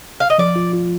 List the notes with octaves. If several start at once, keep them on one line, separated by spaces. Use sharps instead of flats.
F5
D#5
F3 D5
F4
F4